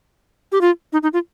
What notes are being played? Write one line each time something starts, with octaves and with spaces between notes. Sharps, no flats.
G4
F4
D#4
D#4
F4